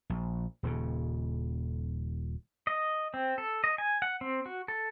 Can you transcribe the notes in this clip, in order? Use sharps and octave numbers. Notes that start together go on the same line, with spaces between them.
A#1
D#1 D#2 C#3
D#5
C4
A4
D#5
G#5
F#5
C4
F#4
A4